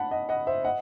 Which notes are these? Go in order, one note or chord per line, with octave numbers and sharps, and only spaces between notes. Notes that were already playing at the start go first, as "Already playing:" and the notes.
Already playing: F#5 A5 B5
D#5 F#5
D#5 F#5
C5 E5
D#5 F#5